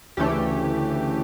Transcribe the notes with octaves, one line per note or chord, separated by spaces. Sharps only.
D2 C#3 E3 A3 G4